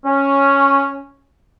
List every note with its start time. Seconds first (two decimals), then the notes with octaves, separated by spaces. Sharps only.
0.05 C#4